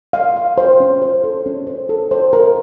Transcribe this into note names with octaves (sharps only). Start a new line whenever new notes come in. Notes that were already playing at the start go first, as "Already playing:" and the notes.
F5
F5
C5
C#4
C5
A4
C#4
C5
A4
C5
A#4